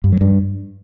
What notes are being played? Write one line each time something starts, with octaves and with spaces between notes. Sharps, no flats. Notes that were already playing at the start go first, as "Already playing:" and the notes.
G2
F#3
G2